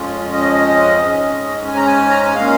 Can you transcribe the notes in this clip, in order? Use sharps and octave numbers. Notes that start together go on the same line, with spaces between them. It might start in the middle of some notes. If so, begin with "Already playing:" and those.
Already playing: F2 F3 G#3 C#4 F4
D#5
G#2 G#3 C#4
G#5
A#5
G#5
A#5
G#5
A#2 G#3 C#4 F5